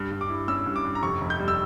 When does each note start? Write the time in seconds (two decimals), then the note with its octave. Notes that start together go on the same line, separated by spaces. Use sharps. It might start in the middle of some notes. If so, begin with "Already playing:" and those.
Already playing: G2
0.11 G2
0.21 D6
0.30 E4
0.48 C#4 E6
0.66 G2
0.76 D6
0.85 G2
0.95 A#5
1.03 F1 C#6
1.21 F1
1.30 G6
1.39 G3
1.48 E6